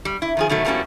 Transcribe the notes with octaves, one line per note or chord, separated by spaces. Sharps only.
G3
E4
D#3 F3 G#4
B2 D#3 F#3 A3
A2 G3 A#3 B3 C#4 F#4